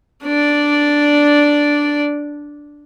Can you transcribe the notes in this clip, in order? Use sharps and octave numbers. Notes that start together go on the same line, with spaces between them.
D4 D5